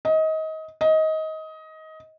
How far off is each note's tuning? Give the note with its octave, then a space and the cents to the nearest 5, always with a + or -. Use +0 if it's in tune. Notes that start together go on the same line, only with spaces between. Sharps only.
D#5 +25
D#5 +20